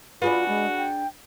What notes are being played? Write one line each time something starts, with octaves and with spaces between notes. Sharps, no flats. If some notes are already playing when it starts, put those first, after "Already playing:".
D4 F4 F#4 G#4 B4
G#3
G5